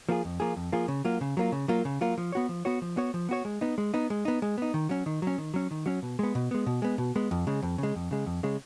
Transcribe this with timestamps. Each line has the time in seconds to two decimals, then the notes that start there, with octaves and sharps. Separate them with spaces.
0.09 F3 A#3 F4 G#4
0.25 F2
0.40 F3 A#3 F4 G#4
0.56 F2
0.72 F3 A#3 F4 G#4
0.88 C#3
1.05 F#3 A#3 F4
1.21 C#3
1.37 F#3 A#3 F4
1.52 C#3
1.68 F#3 A#3 F4
1.85 C#3
2.01 F#3 A#3 F4
2.18 F3
2.32 B3 F#4 C#5
2.49 F3
2.65 B3 F#4 C#5
2.82 F3
2.97 B3 F#4 C#5
3.14 F3
3.29 B3 F#4 C#5
3.45 G#3
3.61 B3 D#4
3.78 G#3
3.94 B3 D#4
4.10 G#3
4.25 B3 D#4
4.42 G#3
4.58 B3 D#4
4.74 D#3
4.89 F#3 C#4
5.06 D#3
5.22 F#3 C#4
5.38 D#3
5.54 F#3 C#4
5.71 D#3
5.86 F#3 C#4
6.02 B2
6.19 G#3 B3
6.35 B2
6.51 G#3 B3
6.66 B2
6.82 G#3 B3
6.98 B2
7.16 G#3 B3
7.31 F2
7.47 C#3 G#3
7.63 F2
7.78 C#3 G#3
7.95 F2
8.11 C#3 G#3
8.26 F2
8.43 C#3 G#3